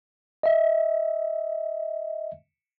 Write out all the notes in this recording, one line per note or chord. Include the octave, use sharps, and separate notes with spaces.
D#5 E5